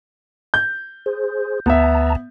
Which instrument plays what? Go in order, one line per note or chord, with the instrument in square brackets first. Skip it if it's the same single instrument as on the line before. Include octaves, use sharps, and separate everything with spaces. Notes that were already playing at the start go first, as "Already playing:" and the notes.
[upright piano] G6
[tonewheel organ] G#4 C5
[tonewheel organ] D2 A5 A#5 [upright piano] B3 E5